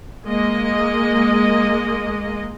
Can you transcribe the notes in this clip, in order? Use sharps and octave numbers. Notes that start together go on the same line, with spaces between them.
G#3 A#3 D#5